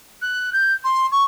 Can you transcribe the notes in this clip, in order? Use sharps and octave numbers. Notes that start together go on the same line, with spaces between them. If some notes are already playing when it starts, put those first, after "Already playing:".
F#6
G6
C6
C#6